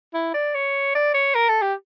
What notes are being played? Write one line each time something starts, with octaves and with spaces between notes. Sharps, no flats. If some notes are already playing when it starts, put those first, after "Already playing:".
E4
D5
C#5
D5
C#5
A#4
A4
G4